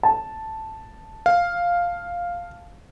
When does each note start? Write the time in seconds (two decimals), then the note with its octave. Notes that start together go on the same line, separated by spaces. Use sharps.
0.03 A5
1.26 F5